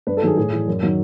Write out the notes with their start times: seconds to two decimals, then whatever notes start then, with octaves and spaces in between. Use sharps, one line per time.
0.07 G2 B4
0.17 A4
0.22 D#3 F#3 G#4
0.37 A2 G#4
0.53 E3
0.68 F#2
0.83 D#3 F#3